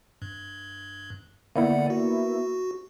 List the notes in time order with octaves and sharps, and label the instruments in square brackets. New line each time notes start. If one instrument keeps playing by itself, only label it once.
[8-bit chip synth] G2
[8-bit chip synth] D3 D5 F#5 [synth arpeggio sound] A#3 B3 E4
[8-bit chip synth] F#4